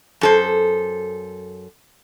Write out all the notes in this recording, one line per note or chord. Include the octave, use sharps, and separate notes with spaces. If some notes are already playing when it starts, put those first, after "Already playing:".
F#2 A4 C5